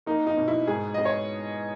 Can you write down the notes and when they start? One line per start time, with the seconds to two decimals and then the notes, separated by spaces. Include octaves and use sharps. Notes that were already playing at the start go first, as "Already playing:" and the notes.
0.06 A#3 D#4
0.27 D#4
0.37 B2
0.48 E4
0.67 G#2 G#4
0.94 B3 D#5
1.05 C#5